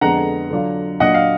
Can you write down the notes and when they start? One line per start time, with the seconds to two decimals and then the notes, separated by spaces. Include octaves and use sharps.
0.01 F2 D3 G#3 B3 D4 F#5 A#5
0.51 D3 F#3 D4 F4
1.00 A#2 F#3 D4 F4 D#5 F#5
1.14 F5